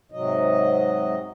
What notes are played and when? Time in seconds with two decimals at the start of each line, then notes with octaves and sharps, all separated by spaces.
0.12 G#2 C3 F#3 D#5